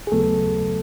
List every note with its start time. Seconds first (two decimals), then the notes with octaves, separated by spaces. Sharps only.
0.07 G#4
0.12 D#2 C#3 F#3 A3 B3 A4